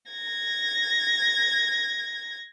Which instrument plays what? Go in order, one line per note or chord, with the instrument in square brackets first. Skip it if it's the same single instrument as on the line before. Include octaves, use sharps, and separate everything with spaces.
[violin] G#6 A#6